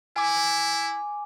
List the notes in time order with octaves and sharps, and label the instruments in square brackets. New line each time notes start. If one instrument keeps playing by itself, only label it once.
[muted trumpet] E4 [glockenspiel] G#5 D6